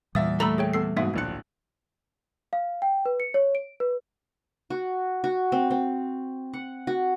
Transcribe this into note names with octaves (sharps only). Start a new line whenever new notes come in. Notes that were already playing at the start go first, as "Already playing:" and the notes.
E2 A#2 E3 G3 E5 D#6 A6
A3 A#5 B5 E6
G#4 C#5 G5
B3 A4 C7
G#2 B2 A#3 B3 E5
D1 A#1 A#3 F#6 C#7
F5
G5
B4
C#7
C#5
D7
B4
F#4
F#4
C4
C4
F#5
F#4